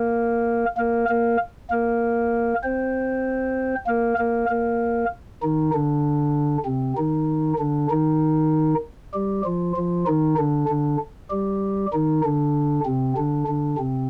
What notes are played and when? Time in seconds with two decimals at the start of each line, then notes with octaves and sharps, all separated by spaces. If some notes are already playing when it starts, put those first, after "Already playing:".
Already playing: A#3 A#4
0.77 A#3 A#4
1.09 A#3 A#4
1.71 A#3 A#4
2.63 C4 C5
3.87 A#3 A#4
4.18 A#3 A#4
4.49 A#3 A#4
5.42 D#3 D#4
5.73 D3 D4
6.66 C3 C4
6.97 D#3 D#4
7.59 D3 D4
7.90 D#3 D#4
9.14 G3 G4
9.45 F3 F4
9.77 F3 F4
10.07 D#3 D#4
10.38 D3 D4
10.68 D3 D4
11.30 G3 G4
11.93 D#3 D#4
12.24 D3 D4
12.86 C3 C4
13.17 D3 D4
13.47 D3 D4
13.78 C3 C4